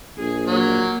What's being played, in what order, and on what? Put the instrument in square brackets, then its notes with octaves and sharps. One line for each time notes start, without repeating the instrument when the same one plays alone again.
[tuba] A#1 [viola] G#4
[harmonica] F#3 [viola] A#3